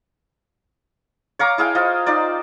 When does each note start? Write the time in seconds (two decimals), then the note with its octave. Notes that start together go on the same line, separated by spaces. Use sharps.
1.39 C#5 F5 A#5 D6
1.58 E4 G#4 F5 G5
1.75 F4 C5 D#5
2.06 D#4 F4 C5 D5